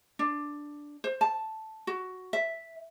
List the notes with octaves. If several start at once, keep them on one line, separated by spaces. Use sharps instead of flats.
D4
C5
A5
F#4
E5